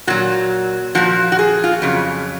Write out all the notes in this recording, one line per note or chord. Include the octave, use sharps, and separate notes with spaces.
A#2 F#3 F#4
A#2 F3 F#4
F#4
G#4
F4
F#4
F2 C#3 F#3 G#4